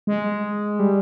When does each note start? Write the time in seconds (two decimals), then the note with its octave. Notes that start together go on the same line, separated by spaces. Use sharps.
0.07 G#3
0.79 G3